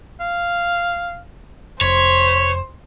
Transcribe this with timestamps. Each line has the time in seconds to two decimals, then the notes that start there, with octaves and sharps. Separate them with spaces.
0.20 F5
1.81 F1 C5 C#5 B5